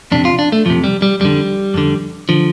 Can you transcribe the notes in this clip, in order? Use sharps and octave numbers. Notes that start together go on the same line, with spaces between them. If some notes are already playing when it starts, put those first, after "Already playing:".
F2 C3 D4
F4
D4
A3
F2 C3 F3
G3
G3
F2 D3 G3
F2 D3
D3 F3